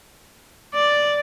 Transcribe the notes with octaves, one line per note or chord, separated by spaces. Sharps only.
D5